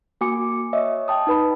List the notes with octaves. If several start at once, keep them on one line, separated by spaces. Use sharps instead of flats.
A#3 F#4 G#5 D6 C#7
C#5 D#5 E5
G5 A5 D#6
D#4 B4 B5